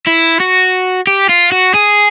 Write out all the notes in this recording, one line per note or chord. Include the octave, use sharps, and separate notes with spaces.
E4
F#4
G4
F4
F#4
G#4